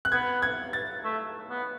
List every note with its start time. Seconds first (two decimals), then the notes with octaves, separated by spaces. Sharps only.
0.05 F#6
0.12 B3 G#6
0.42 G#6
0.73 A6
1.04 A3
1.50 B3